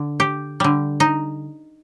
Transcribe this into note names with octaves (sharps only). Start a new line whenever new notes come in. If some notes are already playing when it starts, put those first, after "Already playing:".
Already playing: D3
G4
D3 G3
D#4